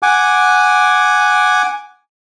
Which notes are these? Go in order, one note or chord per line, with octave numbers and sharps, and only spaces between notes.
F#5 G#5 D6